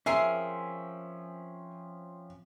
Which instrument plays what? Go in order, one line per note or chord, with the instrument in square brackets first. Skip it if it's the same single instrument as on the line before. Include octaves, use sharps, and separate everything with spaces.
[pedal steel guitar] F3 C4 C#4 [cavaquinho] G#4 A#4 C6 [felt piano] E5